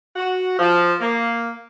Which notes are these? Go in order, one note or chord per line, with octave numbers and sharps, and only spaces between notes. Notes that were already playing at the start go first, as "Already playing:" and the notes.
F#4
F3
A#3